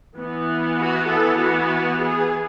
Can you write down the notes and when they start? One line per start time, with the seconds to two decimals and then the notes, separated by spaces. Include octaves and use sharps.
0.18 E3 B3
0.80 F#4
1.11 A4
1.41 F#4
2.02 G#4